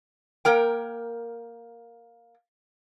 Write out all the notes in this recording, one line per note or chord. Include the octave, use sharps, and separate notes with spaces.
A#3 A#4 G5